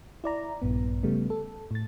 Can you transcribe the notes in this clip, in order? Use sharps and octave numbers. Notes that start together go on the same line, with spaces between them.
E4 D5 A#5
A#1 G2 B3
C#3 G3 A3 B3
A4
A2 A6